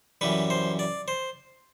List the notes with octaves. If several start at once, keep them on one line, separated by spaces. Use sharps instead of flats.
F#2 E3 G3 B4
C5
D5
C5